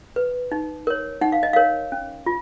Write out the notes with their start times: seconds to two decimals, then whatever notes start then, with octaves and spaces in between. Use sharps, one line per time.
0.16 B4
0.52 D#4
0.87 A#4 C#5
1.21 D#4 F#5
1.32 F5
1.43 D#5
1.53 A#4 C#5 F5
1.92 C#4
2.26 F4